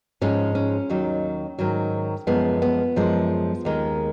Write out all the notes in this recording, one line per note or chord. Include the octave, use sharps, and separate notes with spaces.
G#2 F3 G#3 C#4
C#4
D#2 D#3 F#3
G#2 D#3 F#3
F#2 F3 G#3 B3
B3
F#2 F3 G#3
D#2 D#3 G#3